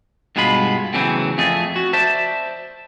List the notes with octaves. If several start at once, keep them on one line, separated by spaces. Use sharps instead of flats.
G2 B2 G#3 F4 B5
E2 A2 C#3 E3 F#3 C4
F2 A3 G#4
F#4
C5 D5 E5 A5